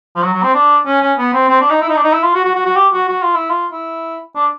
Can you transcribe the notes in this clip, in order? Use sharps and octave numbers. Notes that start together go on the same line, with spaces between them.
F3
F#3
F#3
C4
D4
C#4
C#4
B3
C4
C4
D4
D#4
E4
D#4
D4
D#4
E4
F4
F#4
F#4
F#4
F#4
G4
F#4
F#4
F4
E4
F4
E4
D4